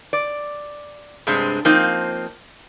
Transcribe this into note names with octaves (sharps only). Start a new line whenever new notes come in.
D5
G2 C3 G#3 C4 D4
F3 A#3 C4 D#4